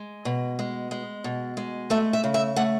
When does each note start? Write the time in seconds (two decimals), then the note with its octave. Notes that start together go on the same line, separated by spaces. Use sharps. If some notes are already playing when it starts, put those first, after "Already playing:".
Already playing: G#3
0.25 B2
0.59 G#3
0.91 G#3
1.24 B2
1.57 G#3
1.90 A3 E5
2.13 E5
2.24 C#3
2.34 E5
2.56 A3 F#5